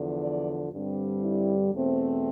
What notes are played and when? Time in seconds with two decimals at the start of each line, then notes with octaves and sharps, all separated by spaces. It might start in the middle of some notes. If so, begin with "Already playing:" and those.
Already playing: E2 D3 F3
0.20 D5
0.72 G2 D3 G3 C4
1.21 E4
1.72 E2 B2 A3 C4